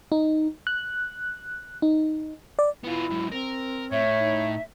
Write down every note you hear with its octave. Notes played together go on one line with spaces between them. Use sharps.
D#4
F#6
D#4
D5
B3 E4 F4
G#2 F#3
C4 A#4
A2 C#5 E5
D#4